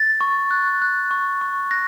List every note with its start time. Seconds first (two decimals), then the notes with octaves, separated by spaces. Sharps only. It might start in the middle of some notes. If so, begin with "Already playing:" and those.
Already playing: A6
0.21 C#6
0.51 F#6
0.82 F#6
1.11 C#6
1.41 C#6
1.71 F#6 A#6